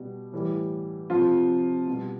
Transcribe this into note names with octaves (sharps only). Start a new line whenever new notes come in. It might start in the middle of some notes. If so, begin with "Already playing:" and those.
Already playing: B2 G3
A2 E3 G3
C3 F3 F4
B2 G3